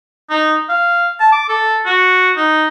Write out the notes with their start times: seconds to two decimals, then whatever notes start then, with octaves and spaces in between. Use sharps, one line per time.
0.30 D#4
0.69 F5
1.20 A5
1.32 D6
1.49 A4
1.86 F#4
2.37 D#4